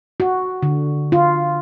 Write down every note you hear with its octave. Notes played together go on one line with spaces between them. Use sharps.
F#4
D3
F4